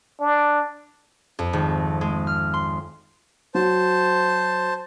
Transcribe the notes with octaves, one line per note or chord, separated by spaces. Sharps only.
D4
F2
G#1
G#3
F6
C6
F#3 C5 A5